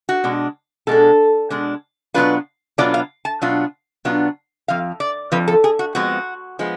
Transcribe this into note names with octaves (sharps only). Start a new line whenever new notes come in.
F#4
B2 G#3 D4
B2 G#3 D4 A4
B2 G#3 D4
B2 F#3 B3 D4 F4 B4
B2 F#3 B3 D4 F4 D5
F5
A5
B2 F#3 B3 D4 F4
B2 F#3 B3 D4 F4
F2 F3 F5
D5
F2 F3 B4
A4
G#4
F#4
F2 F3 G#3 B3 F#4
F3 G#3 B3